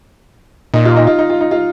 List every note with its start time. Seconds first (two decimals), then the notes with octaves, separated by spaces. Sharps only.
0.74 A#2 D#4
0.85 F4
0.96 D#4
1.07 F4
1.19 D#4
1.30 F4
1.41 D#4
1.51 F4